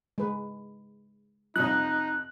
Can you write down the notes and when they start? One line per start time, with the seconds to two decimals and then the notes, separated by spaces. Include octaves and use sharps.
0.18 G#3 B4
1.56 F2 C3 F3 D#4 F#6